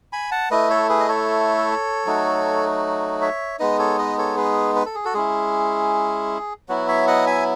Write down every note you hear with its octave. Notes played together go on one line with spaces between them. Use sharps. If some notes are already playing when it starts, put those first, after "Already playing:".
G#5 B5
F#5 A5
A3 E4 B4 D#5
A4 C#5
G#4 B4
D#5
A4 C#5
F#3 A3 D#4 F#4
C#5 E5
G#3 B3 D#4 B4 D#5
A4 C#5
B4 D#5
A4 C#5
G#4 B4
B4
A4
G#4
F#4 A4
G#3 C#4 E4 G#4
F#3 B3 E4 F#4
C#5 E5
D#5 F#5
E5 G#5